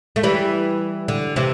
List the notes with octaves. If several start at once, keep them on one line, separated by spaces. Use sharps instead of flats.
A3
E3 G3
D3
C3 E3